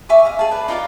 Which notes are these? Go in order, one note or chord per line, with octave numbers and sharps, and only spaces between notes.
E5 G#5 C#6 D6
D#5 F5
G#4 G#5 A5
B4 D5
D#4 F4 D5 F5